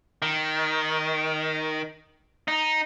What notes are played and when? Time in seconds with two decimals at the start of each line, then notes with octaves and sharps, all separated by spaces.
0.22 D#3
2.48 D#4